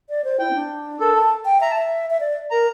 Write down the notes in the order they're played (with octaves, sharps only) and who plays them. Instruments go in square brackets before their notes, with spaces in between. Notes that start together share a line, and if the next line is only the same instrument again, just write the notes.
[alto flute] D5
C5
[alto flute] E4 [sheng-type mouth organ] G5
[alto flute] C4
D4
[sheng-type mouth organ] A4 [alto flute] A#4
[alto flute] A5
G5
[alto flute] E5 [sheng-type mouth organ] A#5
[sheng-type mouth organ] A5
[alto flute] E5
E5
D5
[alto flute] A#4 [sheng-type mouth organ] A#5